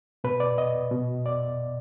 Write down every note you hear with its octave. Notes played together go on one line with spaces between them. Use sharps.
B2 B4
D5
D#5
B2
D5